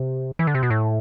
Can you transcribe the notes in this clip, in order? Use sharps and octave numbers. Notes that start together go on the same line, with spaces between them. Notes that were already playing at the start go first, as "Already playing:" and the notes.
Already playing: C3
E3
D3
C3
B2
A2